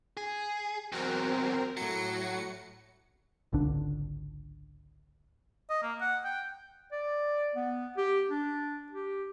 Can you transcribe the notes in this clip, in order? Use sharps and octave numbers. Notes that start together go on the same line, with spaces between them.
G#4
E2 F#3 C4 A#4
A2 F#3 C#7
G#1 C#2 D3 D4
D#5
A#3
F#5
G5
D5
B3
G4
D4
G4